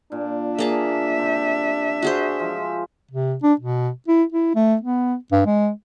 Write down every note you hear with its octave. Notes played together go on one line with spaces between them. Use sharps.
A#2 D4
A#3 G#4 E5 A5
C3
F#4 G#4 C5
F3 G#3
C3
D4
B2
E4
E4
A3
B3
G2
G#3